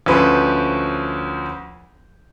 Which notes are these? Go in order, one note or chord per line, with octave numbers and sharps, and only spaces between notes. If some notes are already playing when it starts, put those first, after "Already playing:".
D2 F3 C#4 B4 C5